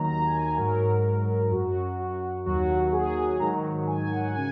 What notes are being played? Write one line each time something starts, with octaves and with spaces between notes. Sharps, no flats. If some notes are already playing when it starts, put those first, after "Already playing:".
Already playing: D#2 D#3 F#3 A#5
G#5
G#2 F#3 A#4
F#2 F#3 F#4
F#4
D#2 D#3 F#3 F#4
G#4
G#2 D#3 F#3 A#5
G#5
F#5
C#3 G#5